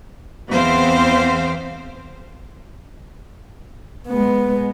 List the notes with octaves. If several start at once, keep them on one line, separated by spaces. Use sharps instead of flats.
E2 B3 C4 C5 F5
G#3 B3